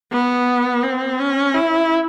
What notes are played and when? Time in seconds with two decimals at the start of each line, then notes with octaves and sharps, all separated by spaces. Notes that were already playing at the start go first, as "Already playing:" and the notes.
0.12 B3
0.84 C4
1.20 C#4
1.55 E4